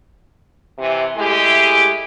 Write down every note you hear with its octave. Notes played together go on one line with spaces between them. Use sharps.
C3 E3
G#3 A3 E4 G4